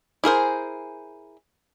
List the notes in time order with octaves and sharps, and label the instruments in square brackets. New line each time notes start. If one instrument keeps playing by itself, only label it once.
[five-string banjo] E4 G#4 A#4 C5